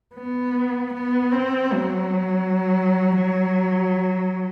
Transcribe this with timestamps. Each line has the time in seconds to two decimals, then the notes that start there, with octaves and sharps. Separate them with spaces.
0.15 B3
0.94 B3
1.32 C4
1.72 F#3